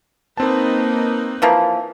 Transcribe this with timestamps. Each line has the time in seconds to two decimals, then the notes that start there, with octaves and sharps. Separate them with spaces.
0.37 A#3 C4 D#4 B4 A5
1.42 E3 F3 A#3